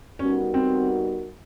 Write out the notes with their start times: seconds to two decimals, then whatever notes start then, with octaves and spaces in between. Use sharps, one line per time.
0.19 G3 B3 C#4 D#4 F#4 A#4
0.54 C4